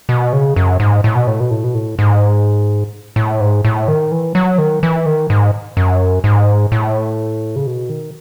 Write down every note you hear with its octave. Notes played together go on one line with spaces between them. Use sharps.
B2
C#3
F#2
G#2
A2
B2
A2
B2
A2
B2
A2
G#2
A2
G#2
A2
D#3
E3
F#3
D#3
E3
D#3
G#2
F#2
G#2
A2
C#3
B2
D#3